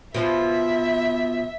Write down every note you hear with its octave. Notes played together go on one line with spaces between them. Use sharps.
B2 F3 E5